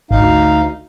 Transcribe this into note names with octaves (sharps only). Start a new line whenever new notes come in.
G#1 D2 D#4 F5